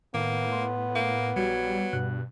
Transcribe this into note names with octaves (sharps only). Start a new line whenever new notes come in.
A2 D#3 A#3 B3
C6
A#3
A#1 F#3 G3 F#4 G#6
G2 B2 F#6